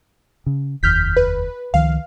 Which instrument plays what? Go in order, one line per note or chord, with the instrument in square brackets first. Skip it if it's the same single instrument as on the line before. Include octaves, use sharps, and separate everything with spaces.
[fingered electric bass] C#3
[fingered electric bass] F1 D#2 [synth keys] F6 G6 B6
[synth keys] B4
[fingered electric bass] C#2 D#3 F3 [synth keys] F5